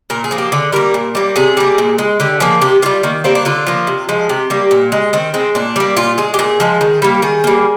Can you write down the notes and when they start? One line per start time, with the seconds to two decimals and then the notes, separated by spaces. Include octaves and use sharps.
0.10 A#2 A#4
0.24 G#4
0.31 F3 A#3
0.38 G4
0.52 D3 G#4
0.72 G3 A#3 A#4
0.94 A#2
1.15 G3 A#3
1.36 C3 G#4
1.57 G3 A#3
1.78 A#2
1.98 G#3
2.20 D3 G4
2.40 F3 A#3 G#4
2.61 C3 G4
2.82 G3 A#3 F4
3.03 D#3 A#3
3.24 G3 A#3 C4
3.35 D4
3.45 D3 F4
3.67 F3 A#3
3.87 C3
4.09 F3 G#3
4.29 C3 G4
4.50 G3 A#3
4.71 A#2
4.92 G#3
5.13 D#3 C4
5.34 G#3 C4
5.55 A#2 D4
5.76 G3 A#3
5.97 A#2 F4
6.18 G#3 G#4
6.34 G4
6.39 A#2 G#4
6.60 F3 G#3
6.81 D#3
7.02 G3 A#3
7.22 D#3 G#4
7.44 G3 A#3